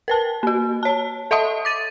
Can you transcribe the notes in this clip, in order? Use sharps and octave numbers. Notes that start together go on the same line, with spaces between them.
A#4 B4 A5
A#3 F#4
C#5 A5
A4 D#5 E5 A5 D#6
D6 A6 D#7